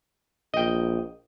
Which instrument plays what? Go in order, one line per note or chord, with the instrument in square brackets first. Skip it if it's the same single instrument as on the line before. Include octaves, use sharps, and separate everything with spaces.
[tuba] A#1 [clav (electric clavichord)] D#5 G5